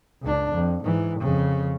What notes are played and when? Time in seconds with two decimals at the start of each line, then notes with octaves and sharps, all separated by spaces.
0.22 C#2 D4
0.53 F2
0.84 G#2 E3
1.20 F2 C#3